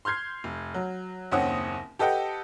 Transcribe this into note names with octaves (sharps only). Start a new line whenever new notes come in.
C6 F6 G6 G#6 C7
F1
F#3
F#1 D#2 C4 C#4 F#5 D#6
G4 A4 B4 D#5 F#5 G5